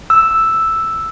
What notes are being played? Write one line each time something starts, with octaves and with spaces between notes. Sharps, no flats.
E6